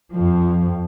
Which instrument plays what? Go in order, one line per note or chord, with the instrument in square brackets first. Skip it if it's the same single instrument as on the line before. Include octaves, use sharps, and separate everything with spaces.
[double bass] F2 F3